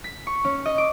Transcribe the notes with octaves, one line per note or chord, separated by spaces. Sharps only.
B6
C#6
C#4
D#5
D6